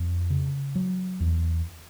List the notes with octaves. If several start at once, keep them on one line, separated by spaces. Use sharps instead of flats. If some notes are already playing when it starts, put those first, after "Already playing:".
Already playing: F2
C#3
F#3
E2